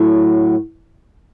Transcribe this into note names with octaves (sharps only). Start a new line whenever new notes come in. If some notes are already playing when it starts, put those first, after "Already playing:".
Already playing: A2 F#3